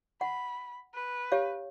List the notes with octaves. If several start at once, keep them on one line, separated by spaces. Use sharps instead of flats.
F#5 B5
B4
G4 C#5 F5